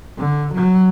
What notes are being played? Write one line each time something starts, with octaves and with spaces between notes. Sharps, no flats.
D3
F#3